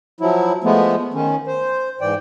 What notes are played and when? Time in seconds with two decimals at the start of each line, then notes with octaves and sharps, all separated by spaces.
0.21 F3 F#3 E4
0.64 F3 G#3 A3 B3
1.14 D#3 C#4
1.47 C5
2.01 G#2 E3 D5 G5